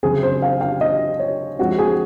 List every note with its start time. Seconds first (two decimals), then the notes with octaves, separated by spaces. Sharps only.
0.03 C#3 F#3 C4 G#4
0.23 C5
0.42 F5
0.61 F5
0.81 D#5
1.19 C#5
1.59 F3 G#3 C4 F#4
1.79 G#4